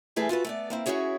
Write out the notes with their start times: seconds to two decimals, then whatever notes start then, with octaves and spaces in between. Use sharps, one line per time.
0.16 E3 G3 A3 G#4 A4 B4
0.29 F4 F#4 A4 B4
0.44 A3 B3 D5
0.70 A#3 C4 E4
0.86 C#4 D4 E4 F#4 G#4 C#5